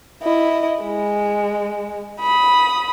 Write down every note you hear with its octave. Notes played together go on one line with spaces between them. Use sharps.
E4 D#5
G#3
B5 D#6